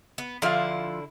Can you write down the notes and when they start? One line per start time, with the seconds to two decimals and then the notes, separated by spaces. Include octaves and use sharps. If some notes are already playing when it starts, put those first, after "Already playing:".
0.18 B3
0.42 D3 F3 E4 F4 F5